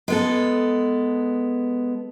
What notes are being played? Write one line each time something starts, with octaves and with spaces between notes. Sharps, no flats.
G#3 B3 A4